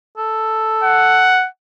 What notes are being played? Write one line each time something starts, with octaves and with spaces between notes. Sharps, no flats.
A4
F#5